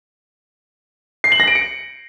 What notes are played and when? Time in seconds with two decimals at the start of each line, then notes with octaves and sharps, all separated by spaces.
1.24 C7
1.32 F#7
1.40 A#6
1.47 D7
1.55 C#7